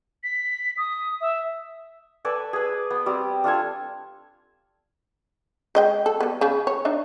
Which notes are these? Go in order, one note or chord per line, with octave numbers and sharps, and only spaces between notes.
B6
D#6
E5
A4 B4 D5 G#5
G#4 B4
B3
G3 C4 G4
D4 F4 A4 G#5
G#3 D#5 G5
A4
G3 B3
C#3
C#5
D4 D#4 E5